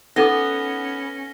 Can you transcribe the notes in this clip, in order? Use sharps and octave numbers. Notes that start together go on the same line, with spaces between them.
B3 C#4 D#4 A4 D6 A#6 G7